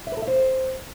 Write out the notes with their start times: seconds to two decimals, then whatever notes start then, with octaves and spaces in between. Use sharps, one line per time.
0.07 E5
0.12 B4
0.17 A4
0.22 E5
0.27 C5